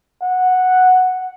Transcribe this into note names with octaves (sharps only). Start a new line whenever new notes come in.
F#5